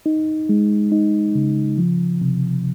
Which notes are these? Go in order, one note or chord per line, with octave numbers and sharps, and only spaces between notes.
D#4
G#3
D#4
C#3
F3
C3